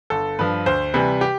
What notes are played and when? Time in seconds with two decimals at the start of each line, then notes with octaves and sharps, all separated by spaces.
0.10 G1 A4
0.39 G2 F3 B4
0.66 D2 C5
0.94 C3 E3 G3 B4
1.21 G4